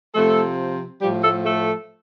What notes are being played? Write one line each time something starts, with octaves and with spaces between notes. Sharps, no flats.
C3 F3 A3 A4
A2 F3 G3 G4
A3 A4
A3 A4